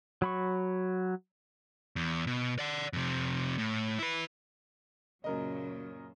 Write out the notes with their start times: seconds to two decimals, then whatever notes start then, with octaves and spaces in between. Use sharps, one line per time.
0.22 F#3 B5 C#6
1.96 E2
2.27 B2
2.59 D5 F#5
2.93 F2 C3
3.58 A2
3.99 E4 B4
5.24 F#2 A#2 C#3 F#3 A#4 D#5